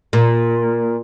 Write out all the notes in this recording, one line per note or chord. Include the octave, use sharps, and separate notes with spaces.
A#2